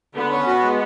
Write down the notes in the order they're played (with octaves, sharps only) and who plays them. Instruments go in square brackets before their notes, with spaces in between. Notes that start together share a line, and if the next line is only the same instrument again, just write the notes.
[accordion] D3 [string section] B3
[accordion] C#4
F#4
G#3